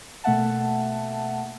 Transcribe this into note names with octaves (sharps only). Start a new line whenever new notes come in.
B2 A3 A#3 E5 F#5 A5